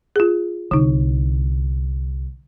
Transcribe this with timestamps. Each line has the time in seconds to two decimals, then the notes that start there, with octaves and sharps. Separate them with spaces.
0.16 F4 G#4
0.71 C2 D3 D#4